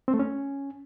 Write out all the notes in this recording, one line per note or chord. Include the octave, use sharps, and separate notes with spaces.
C4
A3
C#4